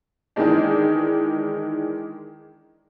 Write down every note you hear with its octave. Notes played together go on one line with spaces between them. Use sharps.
D#3 E3 G#3 D4